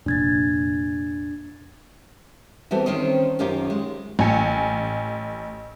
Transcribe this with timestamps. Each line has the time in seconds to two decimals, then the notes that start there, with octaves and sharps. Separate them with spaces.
0.06 F1 A#2 D4 G#6 A6
2.71 E3 G3 B3 C4 F#4 A4
2.86 D#3 C4 C#4 C5 D#5
3.39 F#2 D#3 C#4 F4 G4 A#4
3.70 G#3
4.19 A1 G#5 C#7